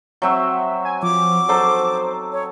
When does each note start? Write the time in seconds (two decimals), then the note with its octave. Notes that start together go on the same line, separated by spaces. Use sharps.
0.22 F#3 C4 F#4 E5
0.85 G#5
1.03 F3 D6
1.49 F#3 D#4 A4 C5
2.32 C#5